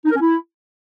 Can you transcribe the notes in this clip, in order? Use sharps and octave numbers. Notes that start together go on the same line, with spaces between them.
D#4
A#4
C#4
E4